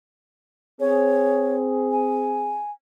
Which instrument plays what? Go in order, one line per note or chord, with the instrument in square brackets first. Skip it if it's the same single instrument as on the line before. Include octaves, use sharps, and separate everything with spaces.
[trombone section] C4 G#4 [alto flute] C#5
[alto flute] G#5